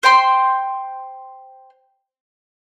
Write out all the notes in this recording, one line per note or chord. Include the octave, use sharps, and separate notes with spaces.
C5 G5 C6